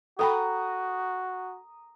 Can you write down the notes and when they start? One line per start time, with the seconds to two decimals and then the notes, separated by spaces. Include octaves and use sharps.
0.19 F#4 A4 G5 A#5 B5 D#6